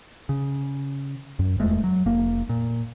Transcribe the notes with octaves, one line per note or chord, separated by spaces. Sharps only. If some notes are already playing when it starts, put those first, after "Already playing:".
C#3
F#2
D#1 E2 G#3 A3
F#3
F1 A#3
A#2